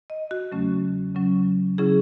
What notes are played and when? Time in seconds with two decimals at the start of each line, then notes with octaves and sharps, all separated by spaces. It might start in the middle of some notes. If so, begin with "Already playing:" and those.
0.10 D#5
0.31 F#4
0.52 E2 C#3 F#3 A3 C#4
1.15 C#3 F#3 C#4
1.78 C#3 F#3 C#4 E4 G#4